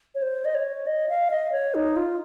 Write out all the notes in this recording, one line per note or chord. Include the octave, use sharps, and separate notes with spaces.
C#5
C5
D#5
C#5
D#5
F5
D#5
C#5
D#4
F4